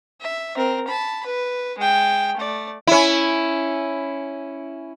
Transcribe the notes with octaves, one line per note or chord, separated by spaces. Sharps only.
E5
C4 A#4
A5 B5
B4
G#3 G5
A3 D5
C#4 E4